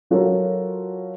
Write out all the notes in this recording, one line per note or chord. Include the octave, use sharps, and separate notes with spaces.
F#3 F4 F#4 A4 A#4 C#5